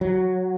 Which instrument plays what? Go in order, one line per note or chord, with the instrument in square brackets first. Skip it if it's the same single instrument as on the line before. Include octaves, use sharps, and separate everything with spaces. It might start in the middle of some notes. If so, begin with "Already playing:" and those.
[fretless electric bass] F#3